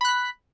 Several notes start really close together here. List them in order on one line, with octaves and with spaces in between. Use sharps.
B5 F#6 B6